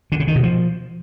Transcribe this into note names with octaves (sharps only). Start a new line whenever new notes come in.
D3
C#3
D#3
B2
F3